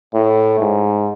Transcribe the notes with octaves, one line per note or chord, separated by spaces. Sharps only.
A2
G#2